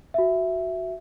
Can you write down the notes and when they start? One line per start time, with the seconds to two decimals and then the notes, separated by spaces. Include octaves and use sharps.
0.14 F#4 E5